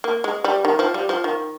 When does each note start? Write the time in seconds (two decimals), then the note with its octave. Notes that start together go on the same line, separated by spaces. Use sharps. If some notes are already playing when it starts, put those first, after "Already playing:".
0.04 A#3
0.24 G#3
0.44 G3
0.65 D#3
0.79 F3
0.94 G3
1.09 F3
1.24 D#3